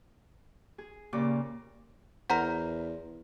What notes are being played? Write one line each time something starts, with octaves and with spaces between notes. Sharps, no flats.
G#4
A#2 C#3 G4 D5
E2 A#4 C5 F#5 A#5